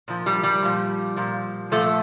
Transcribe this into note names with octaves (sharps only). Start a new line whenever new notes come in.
A#2 F3
G3
G3
A#2 F3
A#2 F3
A#2 F3 A3